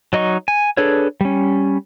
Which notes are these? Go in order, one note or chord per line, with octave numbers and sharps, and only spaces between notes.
F#3 D#4 D#5 C#6
G#5
D4 G#4 A4 B4 C#5
G3 C#4